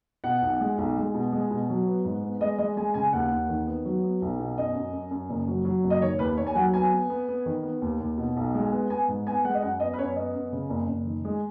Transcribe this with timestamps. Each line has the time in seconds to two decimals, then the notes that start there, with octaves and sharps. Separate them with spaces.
0.24 B2 F#5
0.42 B1
0.61 G#3
0.78 B1
0.97 G#3
1.14 B2
1.32 G#3
1.50 B2
1.69 F#3
1.87 B3
2.05 G#2
2.23 B3
2.40 G#3 D#5
2.58 G#3 D#5
2.77 G#3 G#5
2.94 C#3 G#5
3.13 D#2 F#5
3.31 D#2
3.49 D#3
3.67 B3
3.85 F#3
4.03 B3
4.22 B1
4.39 B2
4.57 F#2 D#5
4.75 F#2
4.93 F#2
5.11 F#2
5.29 F#1
5.48 F#3
5.65 F#3
5.84 F#1
5.90 D#5
6.01 D#3 C#5
6.19 D#2 B4
6.37 D#2 C#5
6.47 G#5
6.55 F#3 F#5
6.74 B3 G#5
6.92 B3
7.10 B3
7.28 B3
7.46 D#3
7.63 B3
7.82 D#2
8.00 D#2
8.18 B2
8.36 B1
8.54 G#3
8.72 B3
8.90 B3 G#5
9.08 G#2
9.26 B3 G#5
9.44 G#3 F#5
9.54 D#5
9.62 F#2 F#5
9.80 B3 D#5
9.93 B4
9.98 F#2 C#5
10.16 B3 D#5
10.34 F#2
10.52 C#3
10.70 F#1
10.88 F#1
11.06 D#3
11.25 G#3